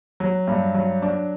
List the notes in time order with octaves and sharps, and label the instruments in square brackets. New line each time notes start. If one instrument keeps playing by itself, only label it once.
[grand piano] F#3
G2
F#3
D4